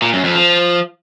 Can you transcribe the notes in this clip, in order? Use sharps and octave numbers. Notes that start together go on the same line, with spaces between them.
A#2
F#2
F2
F3